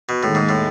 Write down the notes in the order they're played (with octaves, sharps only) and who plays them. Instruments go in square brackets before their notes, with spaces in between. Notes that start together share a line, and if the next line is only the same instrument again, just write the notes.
[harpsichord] B2
[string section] D#2 D#3 G#3 [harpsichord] A2
[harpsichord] G#2
A2